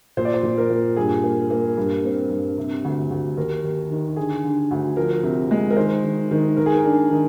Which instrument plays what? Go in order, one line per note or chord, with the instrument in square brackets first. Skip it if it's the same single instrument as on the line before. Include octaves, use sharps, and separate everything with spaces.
[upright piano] A#2 C5
D5
C5
A#2
A#4
A#2
G2 G#4
A#3
A#3
G2
C4
G2
C3
D2
D2
D#2 A#4
D#2
D#3
D3 G#4
D3
D2
F3 A#4
C3
G#3
A#4
D#3 C5
D#3
D#3
D#3 A#4
G#4
A#4
D4
D#3